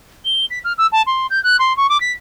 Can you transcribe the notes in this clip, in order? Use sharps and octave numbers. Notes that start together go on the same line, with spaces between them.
G7
B6
F6
E6
A5
C6
G6
F#6
C6
C#6
D6
B6